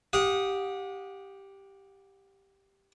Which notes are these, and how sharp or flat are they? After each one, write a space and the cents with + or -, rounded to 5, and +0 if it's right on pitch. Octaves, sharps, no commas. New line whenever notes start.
G4 +0 F#5 -35 D#6 +0